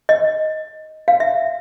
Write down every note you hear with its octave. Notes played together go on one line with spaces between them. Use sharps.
D#5
F5
E5